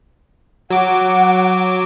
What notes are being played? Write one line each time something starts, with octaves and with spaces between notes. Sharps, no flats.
F#3 F#5 D6